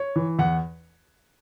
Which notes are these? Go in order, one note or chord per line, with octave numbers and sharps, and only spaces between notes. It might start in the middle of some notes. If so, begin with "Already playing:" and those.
Already playing: C#5
E3
E2 F#5